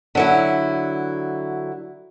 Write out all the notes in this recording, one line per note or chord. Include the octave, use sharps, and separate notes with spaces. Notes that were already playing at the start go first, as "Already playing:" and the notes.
D3 F#3 E4